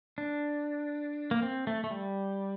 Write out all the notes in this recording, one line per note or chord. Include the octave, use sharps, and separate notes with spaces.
D4
A#3
C4
A3
A3
G3